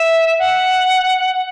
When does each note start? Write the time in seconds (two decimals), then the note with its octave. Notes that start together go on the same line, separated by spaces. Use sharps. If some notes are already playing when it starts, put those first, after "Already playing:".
Already playing: E5
0.39 F#5